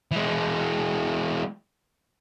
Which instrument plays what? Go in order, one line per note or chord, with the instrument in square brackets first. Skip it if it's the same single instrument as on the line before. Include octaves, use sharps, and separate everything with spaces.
[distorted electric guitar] E3 G#3